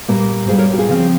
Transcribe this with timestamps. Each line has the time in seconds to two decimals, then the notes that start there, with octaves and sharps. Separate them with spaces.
0.08 A#2 G3 A#3
0.48 A#2 G3 A#3 G#4 C5
0.58 A#4 C#5
0.73 G4
0.78 F4 G#4
0.89 C#3 F3 C4